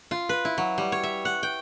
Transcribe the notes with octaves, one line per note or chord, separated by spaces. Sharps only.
F4
B4
E4
F#3
G3
C#5
E5
F#5
G5